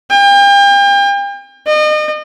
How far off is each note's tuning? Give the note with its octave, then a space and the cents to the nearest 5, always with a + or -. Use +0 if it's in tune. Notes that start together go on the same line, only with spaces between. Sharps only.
G5 +40
D#5 -35